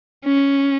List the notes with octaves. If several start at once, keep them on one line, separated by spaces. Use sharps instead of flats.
C#4